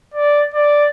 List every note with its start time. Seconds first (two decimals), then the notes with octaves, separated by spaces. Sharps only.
0.14 D5
0.54 D5